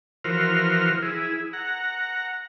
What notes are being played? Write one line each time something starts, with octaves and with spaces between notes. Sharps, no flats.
E3 F3 F#4 A#4 C5 F6
E4 G#4
F#5 A#5